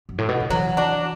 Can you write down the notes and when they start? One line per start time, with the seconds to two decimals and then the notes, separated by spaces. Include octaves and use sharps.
0.09 F#2
0.18 A2
0.29 B2
0.40 D3
0.50 E3 F#3
0.77 D4 F#4